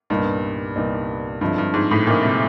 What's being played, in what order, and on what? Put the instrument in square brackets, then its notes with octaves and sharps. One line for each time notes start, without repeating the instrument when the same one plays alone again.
[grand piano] C2 A#2 G3 B3 D#4 [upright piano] G2
[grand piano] C2 A#2 G3 B3 D#4
[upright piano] G2 [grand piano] D3 F3 G#3 C4 E4
[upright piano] G2
G#2
A2
[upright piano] A#2 [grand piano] D3 F3 G#3 C4 E4
[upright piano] C3